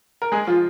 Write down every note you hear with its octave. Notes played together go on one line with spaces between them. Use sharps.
A#4
G#3 G#4
F3 F4